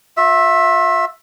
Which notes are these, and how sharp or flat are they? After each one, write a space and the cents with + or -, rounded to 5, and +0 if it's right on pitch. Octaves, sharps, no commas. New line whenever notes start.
F4 +40 E5 +0